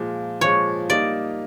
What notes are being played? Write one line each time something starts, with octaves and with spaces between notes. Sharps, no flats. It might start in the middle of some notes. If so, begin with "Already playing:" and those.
Already playing: A#2 F3 G#3
A#2 F3 G#3 C#5
G3 A#3 D#4 D5